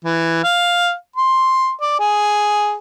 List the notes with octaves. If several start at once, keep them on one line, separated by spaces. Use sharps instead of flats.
E3
F5
C6
D5
G#4